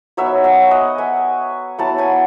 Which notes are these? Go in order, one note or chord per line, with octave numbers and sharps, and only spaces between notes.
F#3 B3 D#4 C#5 E5
E5 G#5
D#5 F#5
E5 G#5
F#3 B3 E4 F#5 A5
G#5 B5